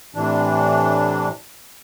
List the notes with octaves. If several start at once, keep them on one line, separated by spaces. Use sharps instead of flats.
A2 C3 E3 D4